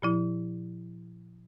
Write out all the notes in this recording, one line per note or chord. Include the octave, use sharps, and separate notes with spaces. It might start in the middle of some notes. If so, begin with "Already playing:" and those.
A#2 F3 E4